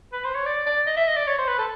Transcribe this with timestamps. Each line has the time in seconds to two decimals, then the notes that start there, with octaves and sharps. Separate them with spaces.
0.13 B4
0.24 C5
0.35 C#5
0.46 D5
0.66 D5
0.87 D#5
0.97 E5
1.07 D#5
1.17 D5
1.27 C#5
1.38 C5
1.47 B4
1.59 A4